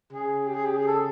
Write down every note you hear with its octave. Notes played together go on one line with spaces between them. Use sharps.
C#3 G#4
G4
G#4
G4
G#4
A4